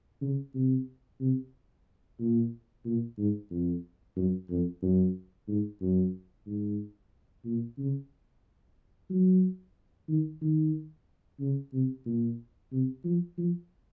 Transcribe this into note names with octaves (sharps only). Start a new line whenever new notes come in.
C#3
C3
C3
A#2
A#2
G#2
F2
F#2
F2
F#2
G#2
F#2
G#2
A#2
C#3
F#3
D#3
D#3
C#3
C3
A#2
C3
F3
F3